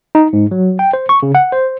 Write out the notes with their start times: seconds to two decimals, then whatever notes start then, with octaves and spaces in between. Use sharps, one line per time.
0.15 D#4
0.33 G#2
0.51 F#3
0.79 G5
0.93 C5
1.09 C#6
1.23 C#3
1.35 F#5
1.52 C5